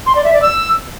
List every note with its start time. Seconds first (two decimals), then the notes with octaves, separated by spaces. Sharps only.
0.06 C6
0.15 D5
0.24 E5
0.33 D5
0.42 E6